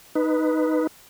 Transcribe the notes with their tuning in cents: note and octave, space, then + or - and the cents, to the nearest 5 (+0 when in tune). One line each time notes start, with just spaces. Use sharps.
D#4 +0 B4 +0